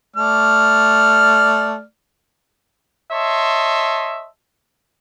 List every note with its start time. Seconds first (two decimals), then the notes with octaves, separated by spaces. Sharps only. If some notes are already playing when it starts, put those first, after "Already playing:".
0.16 A3 D5 F6
3.11 C#5 D#5 E5 A5 C6